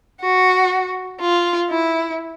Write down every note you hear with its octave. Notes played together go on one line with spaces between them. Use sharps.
F#4
F4
E4